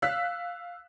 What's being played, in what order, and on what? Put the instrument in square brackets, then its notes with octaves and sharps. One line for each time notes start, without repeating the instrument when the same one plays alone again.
[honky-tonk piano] F5 E6 F#6 B6